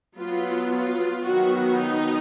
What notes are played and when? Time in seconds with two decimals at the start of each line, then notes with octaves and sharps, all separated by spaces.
0.17 F#3 B3 F4
0.71 F4
1.24 D#3 F#3 B3 F#4
1.78 D#4